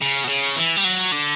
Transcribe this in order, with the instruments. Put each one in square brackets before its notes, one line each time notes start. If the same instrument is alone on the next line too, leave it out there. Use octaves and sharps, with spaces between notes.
[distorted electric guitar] C#3
B2
C#3
E3
G3
F#3
D3